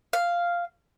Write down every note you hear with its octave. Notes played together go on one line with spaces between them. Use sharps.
F5